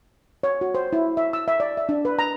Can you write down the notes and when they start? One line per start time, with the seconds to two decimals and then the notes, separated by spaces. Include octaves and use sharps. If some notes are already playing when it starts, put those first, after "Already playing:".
0.43 C#5
0.61 F#4
0.75 C5
0.93 E4
1.17 E5
1.33 E6
1.48 E5
1.60 D5
1.77 E5
1.89 D4
2.05 B4
2.19 A#5